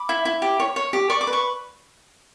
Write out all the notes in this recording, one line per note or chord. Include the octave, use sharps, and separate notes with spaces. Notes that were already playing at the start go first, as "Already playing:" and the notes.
Already playing: B5 D6
E4
E4
G4
C#5
C#5
G4
D5 C#6
D6
B4
C#6